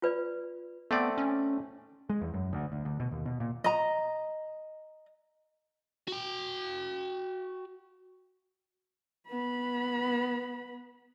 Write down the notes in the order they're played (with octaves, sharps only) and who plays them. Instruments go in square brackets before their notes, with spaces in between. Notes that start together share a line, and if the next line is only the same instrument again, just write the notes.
[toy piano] F4 B4 D5
[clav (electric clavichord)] A3 C4 D5 [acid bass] B3
[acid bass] C#4
[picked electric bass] G#3
E2
F#2
D2
D2
D2
B2
D#2
B2
A#2
[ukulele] D#5 A#5
[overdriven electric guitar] F#4 G5
[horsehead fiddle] B3 B5